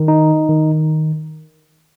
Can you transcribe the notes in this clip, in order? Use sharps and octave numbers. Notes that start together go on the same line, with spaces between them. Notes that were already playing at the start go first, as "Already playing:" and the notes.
Already playing: D#3
D#4
D#3